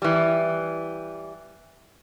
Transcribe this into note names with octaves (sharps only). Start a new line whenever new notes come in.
E3 G3